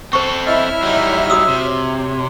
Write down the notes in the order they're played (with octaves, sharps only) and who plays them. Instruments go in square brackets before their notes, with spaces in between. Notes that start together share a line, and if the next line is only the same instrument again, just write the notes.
[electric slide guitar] C4 A4 [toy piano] C5 C#6
[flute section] E4 C#5 [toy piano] D#5 [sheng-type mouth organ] E5 F6
[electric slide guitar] F#3 G3 D#4
[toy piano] F#4 D#6 E6
[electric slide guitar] C3
[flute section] C#5